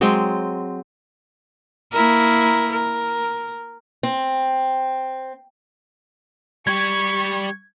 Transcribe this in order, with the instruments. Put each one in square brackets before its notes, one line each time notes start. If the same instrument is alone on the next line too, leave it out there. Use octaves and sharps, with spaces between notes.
[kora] F#3 G#3 C4 G5
[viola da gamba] A#3 E4 A#4
A#4
[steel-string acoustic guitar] C4
[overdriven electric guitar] G3 G4 [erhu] C#6 [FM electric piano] G#6